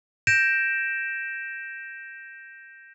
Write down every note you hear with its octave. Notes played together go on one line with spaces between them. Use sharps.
G6 A#6 D7 E7